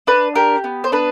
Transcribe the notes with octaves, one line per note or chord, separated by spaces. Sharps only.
D4 B4
G4 A#4
B3
C5
D4 B4